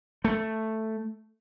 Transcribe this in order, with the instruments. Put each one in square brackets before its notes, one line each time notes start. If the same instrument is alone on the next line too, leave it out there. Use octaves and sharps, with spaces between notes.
[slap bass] A3